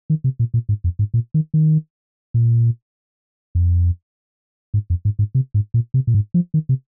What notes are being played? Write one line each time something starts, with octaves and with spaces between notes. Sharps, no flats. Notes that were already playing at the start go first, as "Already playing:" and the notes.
D#3
C3
A#2
A#2
G#2
F2
G#2
A#2
D#3
D#3
A#2
F2
G#2
F2
G#2
G#2
C3
G#2
A#2
C3
A#2
G#2
F3
D#3
C3